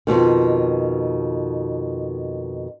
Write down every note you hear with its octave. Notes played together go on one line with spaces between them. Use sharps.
F2 G#2 B2 D#3